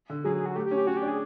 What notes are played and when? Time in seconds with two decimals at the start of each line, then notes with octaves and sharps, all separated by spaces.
0.10 D3
0.24 F#3 G#4
0.36 G#4
0.46 F#4
0.55 A3 G4
0.66 G4
0.71 C#4
0.77 G4
0.87 C#4 F#4
0.97 G4
1.02 D4
1.08 G#4